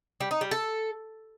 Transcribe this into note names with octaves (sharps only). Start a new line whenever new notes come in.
G3
D#4
G3
A4